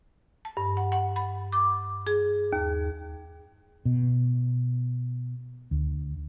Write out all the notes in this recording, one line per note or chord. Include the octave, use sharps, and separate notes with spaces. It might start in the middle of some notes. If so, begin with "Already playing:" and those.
A5
G2
F#5
F#5
B5
D6
G#4
D#2
B2
D2